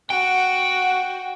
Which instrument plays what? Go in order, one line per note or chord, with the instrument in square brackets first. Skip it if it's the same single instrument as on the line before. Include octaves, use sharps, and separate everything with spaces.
[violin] F#4 [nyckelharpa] F#5 [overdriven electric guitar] G5